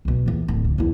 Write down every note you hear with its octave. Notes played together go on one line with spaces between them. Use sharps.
B1 B2
A#1 E2
D1 G#1
D3
E2 E4